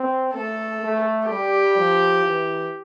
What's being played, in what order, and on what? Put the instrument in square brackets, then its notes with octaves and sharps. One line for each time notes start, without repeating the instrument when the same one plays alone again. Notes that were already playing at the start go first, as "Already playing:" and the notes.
Already playing: [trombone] C4
[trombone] A3 [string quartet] A4
[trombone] A3
[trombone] G3 [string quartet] G4
[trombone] F3
E3